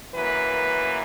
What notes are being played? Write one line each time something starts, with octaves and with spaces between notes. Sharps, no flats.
F#2 E3 A#3 B4